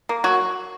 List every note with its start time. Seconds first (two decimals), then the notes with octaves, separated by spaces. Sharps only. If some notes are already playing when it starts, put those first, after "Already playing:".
0.09 A#3
0.24 F#3 F#4